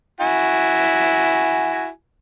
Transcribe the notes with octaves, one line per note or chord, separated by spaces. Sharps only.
E4 F#4 G#5